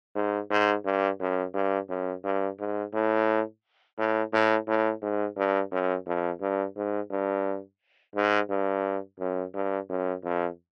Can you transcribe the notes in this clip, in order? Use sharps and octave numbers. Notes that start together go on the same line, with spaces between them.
G#2
G#2
G2
F#2
G2
F#2
G2
G#2
A2
A2
A2
A2
G#2
G2
F#2
F2
G2
G#2
G2
G#2
G2
F#2
G2
F#2
F2